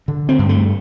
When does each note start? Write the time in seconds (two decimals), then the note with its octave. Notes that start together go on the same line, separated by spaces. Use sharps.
0.08 D3
0.29 C4
0.39 G2
0.49 A3